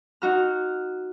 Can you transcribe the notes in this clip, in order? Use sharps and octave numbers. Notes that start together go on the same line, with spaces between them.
D#4 F#4 F6